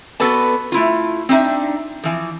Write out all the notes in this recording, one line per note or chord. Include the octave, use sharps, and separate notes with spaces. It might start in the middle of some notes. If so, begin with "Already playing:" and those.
B3 F#4 A4 B4 D5 A5
A3 E4 F4
C4 D4 D#4 E5
E3 F3